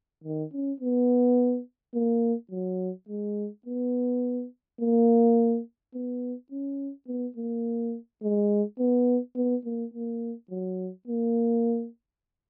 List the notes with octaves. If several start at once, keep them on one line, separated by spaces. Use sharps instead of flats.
D#3
C#4
B3
A#3
F#3
G#3
B3
A#3
B3
C#4
B3
A#3
G#3
B3
B3
A#3
A#3
F#3
A#3